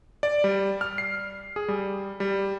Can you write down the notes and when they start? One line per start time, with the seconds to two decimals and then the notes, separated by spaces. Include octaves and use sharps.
0.23 D5
0.44 G3
0.81 F6
0.98 C7
1.56 G#4
1.68 G3
2.20 G3